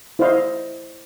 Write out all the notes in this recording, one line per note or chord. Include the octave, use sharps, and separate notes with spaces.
E4 C5 D5 D#5 F5 C6